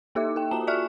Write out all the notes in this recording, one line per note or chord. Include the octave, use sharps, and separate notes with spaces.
A#3 D#4 G4 A4 E5 D6
A4 G5
A#3 F4 F#4 A5 A#5 E7
D5 E5 G#5 C#6 F6 F#6